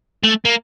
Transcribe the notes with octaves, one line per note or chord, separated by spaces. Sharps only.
A3
A#3